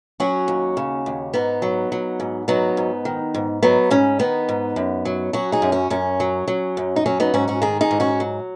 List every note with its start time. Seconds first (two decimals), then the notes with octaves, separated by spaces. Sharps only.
0.20 F#3 C#4 F#4
0.48 D#2
0.77 C#3
1.06 D#2
1.34 G#2 B3 D#4
1.62 F#3
1.92 F#3
2.20 G#2
2.48 F#3 B3 D#4
2.77 G#2
3.05 D#3
3.34 G#2
3.63 F#3 B3 D#4
3.91 G#2 C#4
4.19 D#3 B3 D#4
4.49 G#2
4.76 F#2
5.05 F#3
5.33 F#3 C#4 F#4
5.52 D#4 G#4
5.62 F#2
5.72 C#4 F#4
5.90 F#2 C#4
6.20 F#3
6.48 F#3
6.77 F#2
6.96 D#4
7.06 F#3 C#4
7.20 B3 D#4
7.34 G#2 C#4 F#4
7.48 C#4 F#4
7.62 D#3 D#4 G#4
7.81 D#4 G#4
7.91 G#2
8.00 C#4 F#4
8.20 F#3